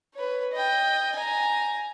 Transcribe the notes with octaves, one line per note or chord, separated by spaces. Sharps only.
B4 C#5
D#5 G5
G#5 A#5